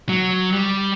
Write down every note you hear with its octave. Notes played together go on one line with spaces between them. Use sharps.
F#3
G3